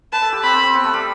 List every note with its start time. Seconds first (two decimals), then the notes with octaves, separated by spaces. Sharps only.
0.12 B4 A5
0.22 A4
0.33 G4
0.43 C4 B5
0.53 C4
0.63 C4
0.74 B3
0.84 A3
0.94 G3